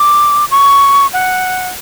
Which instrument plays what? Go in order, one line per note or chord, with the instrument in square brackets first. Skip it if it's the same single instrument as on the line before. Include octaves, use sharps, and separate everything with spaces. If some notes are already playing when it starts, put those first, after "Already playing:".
Already playing: [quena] D6
C#6
F#5